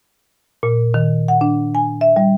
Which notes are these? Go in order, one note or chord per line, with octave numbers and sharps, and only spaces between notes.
A#2
D#3
F#5
D4
G#5
E5
G3